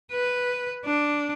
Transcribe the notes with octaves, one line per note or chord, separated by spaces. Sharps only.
B4
D4